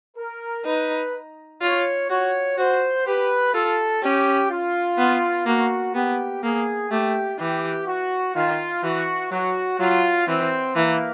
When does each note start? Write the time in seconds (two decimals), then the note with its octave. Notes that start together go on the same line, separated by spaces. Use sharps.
0.17 A#4
0.65 D#4 B4
1.61 F4 C#5
2.10 F#4 C#5
2.58 F#4 C5
3.06 G4 B4
3.54 F4 A4
4.03 C#4 G4
4.50 F4
4.98 B3
5.46 A#3 F#4
5.95 B3 G4
6.43 A#3 G#4
6.91 A3 G4
7.39 E3 G4
7.86 F#4
8.35 D#3 F4
8.83 E3 F#4
9.31 F#3 F#4
9.79 F#3 F4
10.27 E3 C4
10.75 E3 A#3